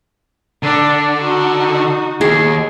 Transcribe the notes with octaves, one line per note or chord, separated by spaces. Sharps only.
D3 D4
D#4 F#4
D#2 G#4